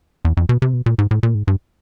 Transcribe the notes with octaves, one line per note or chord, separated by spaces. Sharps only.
E2
F2
B2
C3
B2
A#2
G#2
A2
A#2
G#2
G2